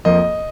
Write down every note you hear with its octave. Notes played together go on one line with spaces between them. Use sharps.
F2 F3 A#3 D#5